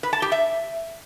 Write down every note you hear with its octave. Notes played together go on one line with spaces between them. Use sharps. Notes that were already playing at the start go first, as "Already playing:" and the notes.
B4
A5
G4
E5